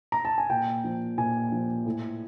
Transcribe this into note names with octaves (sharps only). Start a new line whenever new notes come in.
A#5
A5
G#5
A#2 G5
F3
A#2 G#5
F3
A2